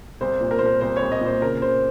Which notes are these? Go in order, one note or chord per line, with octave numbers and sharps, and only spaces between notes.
C2 C5
A#2
A#4
A#2 C5
A#4
C2 C5
C#5
C2
D#5
A#2
C5
C#3 A#4
C#3 C5